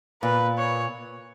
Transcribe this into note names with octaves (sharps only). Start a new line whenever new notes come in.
A#2 B4
C#5